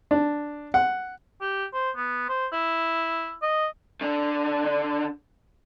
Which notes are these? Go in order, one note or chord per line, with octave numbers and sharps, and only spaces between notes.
D4
F#5
G4
C5
B3
C5
E4
D#5
D3 D4